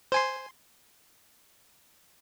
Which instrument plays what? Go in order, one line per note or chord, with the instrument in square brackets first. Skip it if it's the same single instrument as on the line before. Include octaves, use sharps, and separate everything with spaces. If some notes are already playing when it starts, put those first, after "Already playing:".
[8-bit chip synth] C5 G#5 C6